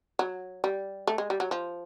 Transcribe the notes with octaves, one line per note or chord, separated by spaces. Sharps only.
F#3
G3
A3
G#3
G3
F#3
F3